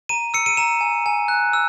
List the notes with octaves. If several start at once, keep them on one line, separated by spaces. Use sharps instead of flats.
A#5 D#7
E6 C#7
D#7
A#5 E7
G#5
G#5
F#6
E6